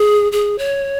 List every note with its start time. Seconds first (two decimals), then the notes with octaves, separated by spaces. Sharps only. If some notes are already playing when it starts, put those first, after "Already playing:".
Already playing: G#4
0.32 G#4
0.58 C#5